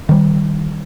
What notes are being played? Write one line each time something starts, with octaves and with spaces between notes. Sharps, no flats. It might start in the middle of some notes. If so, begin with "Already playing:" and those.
D#3 G3